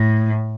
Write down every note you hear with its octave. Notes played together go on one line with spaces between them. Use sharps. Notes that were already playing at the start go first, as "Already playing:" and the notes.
Already playing: A2